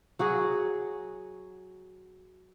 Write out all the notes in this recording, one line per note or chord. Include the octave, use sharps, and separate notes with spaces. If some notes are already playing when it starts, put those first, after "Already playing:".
F#3 F#4 G#4